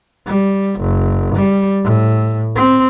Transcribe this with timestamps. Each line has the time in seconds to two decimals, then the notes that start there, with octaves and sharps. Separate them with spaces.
0.27 G3
0.81 F#1
1.35 G3
1.83 A2
2.55 C4